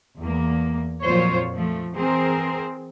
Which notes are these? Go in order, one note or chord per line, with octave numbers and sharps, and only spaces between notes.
E2 A#3
F2 A#2 F#3 F4 C5 C#5
F3 A3
E3 C4 G#4 A#4 C5